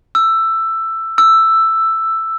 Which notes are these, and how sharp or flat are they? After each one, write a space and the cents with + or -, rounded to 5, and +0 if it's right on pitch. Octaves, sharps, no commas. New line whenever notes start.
E6 +10
E6 +5